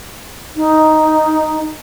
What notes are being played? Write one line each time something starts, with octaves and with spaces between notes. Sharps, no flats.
D#4